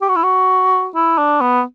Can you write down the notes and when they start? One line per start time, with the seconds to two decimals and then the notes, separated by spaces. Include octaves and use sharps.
0.02 G4
0.09 F#4
0.16 E4
0.23 F#4
0.95 E4
1.18 D4
1.41 B3